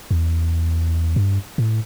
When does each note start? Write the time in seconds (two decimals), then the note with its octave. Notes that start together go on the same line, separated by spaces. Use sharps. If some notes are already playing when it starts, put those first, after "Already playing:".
0.11 E2
1.16 G2
1.58 A2